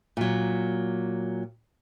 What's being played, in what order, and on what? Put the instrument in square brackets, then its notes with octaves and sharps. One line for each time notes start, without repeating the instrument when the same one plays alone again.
[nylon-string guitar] A#2 F#3